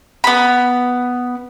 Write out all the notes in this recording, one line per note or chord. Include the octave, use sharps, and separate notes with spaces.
B3 B5